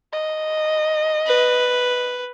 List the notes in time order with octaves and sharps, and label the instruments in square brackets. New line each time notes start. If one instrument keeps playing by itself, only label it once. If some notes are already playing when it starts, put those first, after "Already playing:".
[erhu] D#5
[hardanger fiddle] B4